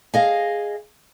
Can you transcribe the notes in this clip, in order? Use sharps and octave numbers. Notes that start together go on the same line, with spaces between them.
G#4 D#5 F5